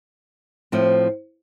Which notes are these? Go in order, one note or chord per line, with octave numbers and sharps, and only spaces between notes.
A2 F3 C4